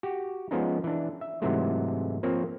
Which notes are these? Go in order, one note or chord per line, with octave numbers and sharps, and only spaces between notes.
F#4 G4
F3 G#3 B3 C#4 D#4
E3 D4
E5
G#2 C3 E3 F#3 G#3 A3
F3 A#3 C4 C#5